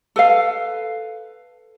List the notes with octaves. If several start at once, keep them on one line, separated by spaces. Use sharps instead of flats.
A4 B4 F5